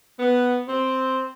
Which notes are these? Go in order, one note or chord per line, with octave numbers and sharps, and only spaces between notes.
B3
C4